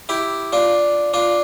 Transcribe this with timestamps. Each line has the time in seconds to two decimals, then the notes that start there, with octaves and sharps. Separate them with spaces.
0.09 E4 G4
0.53 D4 F4
1.14 D4 F4